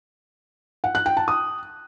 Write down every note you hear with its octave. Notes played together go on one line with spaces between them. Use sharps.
F#5
F#6
G5
A5
D#6